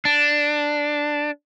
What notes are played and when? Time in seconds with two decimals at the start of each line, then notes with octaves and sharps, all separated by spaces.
0.05 D4